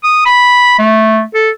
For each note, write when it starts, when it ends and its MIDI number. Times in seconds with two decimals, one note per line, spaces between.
0.04 0.21 87
0.26 0.77 83
0.79 1.21 57
1.35 1.50 69